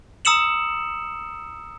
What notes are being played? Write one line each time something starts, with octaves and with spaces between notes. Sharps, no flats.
A#5 D#6 E6 C#7 E7 F#7